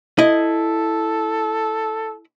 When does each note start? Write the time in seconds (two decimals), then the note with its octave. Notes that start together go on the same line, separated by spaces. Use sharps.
0.19 E4 A4 D#5